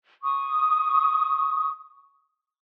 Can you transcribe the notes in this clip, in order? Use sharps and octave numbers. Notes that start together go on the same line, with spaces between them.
C#6 D#6